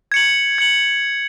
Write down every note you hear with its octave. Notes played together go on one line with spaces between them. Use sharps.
G#6 C#7 F#7
G#6 C#7 F#7